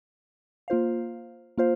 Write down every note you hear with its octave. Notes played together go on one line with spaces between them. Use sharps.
A#3 F4 C5 F5
A#3 F4 C5 F5